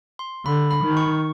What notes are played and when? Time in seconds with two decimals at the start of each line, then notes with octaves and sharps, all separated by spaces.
0.19 C6
0.45 D3 B5
0.71 B5
0.84 D#3
0.97 C#6